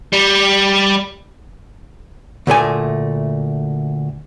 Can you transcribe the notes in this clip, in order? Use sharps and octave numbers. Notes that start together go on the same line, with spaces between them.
G3
D2 A#2 A3 G#5